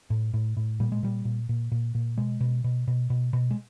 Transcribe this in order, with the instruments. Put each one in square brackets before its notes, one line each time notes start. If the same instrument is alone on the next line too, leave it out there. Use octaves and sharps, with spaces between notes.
[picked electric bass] A2
A2
A2
A#2 G3
G#3
A#2 G3
A#2
A#2
A#2
A#2
B2 G#3
B2
B2
B2
B2
B2
G#3